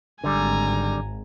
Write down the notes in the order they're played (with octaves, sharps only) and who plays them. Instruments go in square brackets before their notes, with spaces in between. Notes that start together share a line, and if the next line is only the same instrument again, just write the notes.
[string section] G#1 [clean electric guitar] D3 G3 [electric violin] G#5 A#5